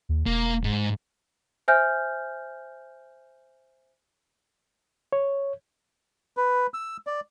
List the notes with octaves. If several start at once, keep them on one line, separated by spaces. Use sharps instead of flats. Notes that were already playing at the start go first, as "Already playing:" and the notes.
D#2
E1 A#3
G#2
C5 E5 G#5 F6 G6
C#5
B4
E6
D5